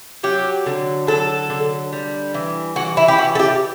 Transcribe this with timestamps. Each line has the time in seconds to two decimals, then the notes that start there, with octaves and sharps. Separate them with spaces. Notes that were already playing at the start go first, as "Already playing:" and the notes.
0.23 F#3 G4
0.66 D3
1.07 F#3 A4
1.50 D3
1.92 G3
2.34 E3
2.76 E3 F#4
2.97 E4
3.08 G4
3.18 E3 F#4
3.35 A4
3.39 G4